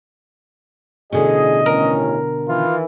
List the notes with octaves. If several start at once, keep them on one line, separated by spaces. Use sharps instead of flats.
A1 B2 D3 G#4 D#5
A1 D#3 C#4 A#4
D#3 E3 F4